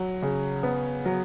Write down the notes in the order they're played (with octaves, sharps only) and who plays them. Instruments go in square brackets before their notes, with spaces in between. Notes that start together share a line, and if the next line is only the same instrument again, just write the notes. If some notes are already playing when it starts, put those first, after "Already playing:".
Already playing: [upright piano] F#3
C#3
B3
F#3